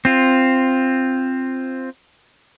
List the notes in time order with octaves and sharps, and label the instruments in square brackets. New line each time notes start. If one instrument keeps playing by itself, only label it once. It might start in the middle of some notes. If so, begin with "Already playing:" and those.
[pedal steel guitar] C4 F4